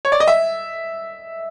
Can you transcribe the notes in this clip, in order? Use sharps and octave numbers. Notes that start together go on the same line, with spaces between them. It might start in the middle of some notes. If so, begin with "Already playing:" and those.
C#5
D5
D#5
E5